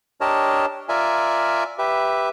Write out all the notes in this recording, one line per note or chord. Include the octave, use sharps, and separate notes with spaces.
D4 G4 A#4 C#5 D#5 A5
F4 A#4 D5 E5 G#5
G4 B4 E5